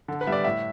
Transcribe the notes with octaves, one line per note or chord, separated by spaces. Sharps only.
D3 A4
B4
G3 B3 E5
D5
A2 E5